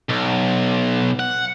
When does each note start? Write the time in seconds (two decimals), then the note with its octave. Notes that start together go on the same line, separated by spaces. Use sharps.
0.09 B1
1.20 F#5